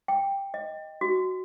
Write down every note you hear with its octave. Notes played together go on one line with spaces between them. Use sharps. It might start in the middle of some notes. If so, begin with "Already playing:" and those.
G5
D#5
F#4